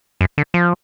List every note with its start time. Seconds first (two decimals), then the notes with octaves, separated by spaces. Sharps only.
0.21 F#2
0.38 D3
0.54 F3